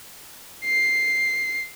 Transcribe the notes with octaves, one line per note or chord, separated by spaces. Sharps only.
C7